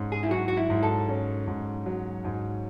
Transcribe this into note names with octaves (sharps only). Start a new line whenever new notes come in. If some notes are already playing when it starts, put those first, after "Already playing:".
Already playing: G#2 C#4
G#4
E4
F#3 F#4
F#4
E4
G#2
A4
C#4
G#2
F#3
G#2